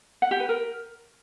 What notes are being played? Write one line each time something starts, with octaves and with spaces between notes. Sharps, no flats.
F#5
G4
B4
A#4